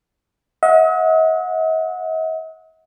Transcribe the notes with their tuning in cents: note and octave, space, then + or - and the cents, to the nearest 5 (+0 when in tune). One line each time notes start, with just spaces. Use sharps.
D#5 +45 F#5 -25